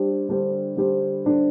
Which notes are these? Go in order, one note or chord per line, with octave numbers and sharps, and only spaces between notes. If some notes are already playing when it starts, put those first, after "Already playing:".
Already playing: G3 D4 G4 C5
D3 G3 D4 G4 C5
D3 G3 D4 G4 C5
D3 G3 D4 G4 C5